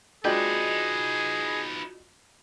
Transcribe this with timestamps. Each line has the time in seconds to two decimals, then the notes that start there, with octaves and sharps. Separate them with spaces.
0.25 G#3 D4 D#4 F4 F#4 G#4 B4 G5